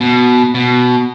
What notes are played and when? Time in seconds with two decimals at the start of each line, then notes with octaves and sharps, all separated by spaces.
0.01 B2
0.55 B2